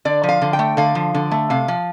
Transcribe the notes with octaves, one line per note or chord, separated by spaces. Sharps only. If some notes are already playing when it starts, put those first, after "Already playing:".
D3 D5
F3
F5
D3
G5
A3
D3 F5
F3
D3
A3
C3 F5
F3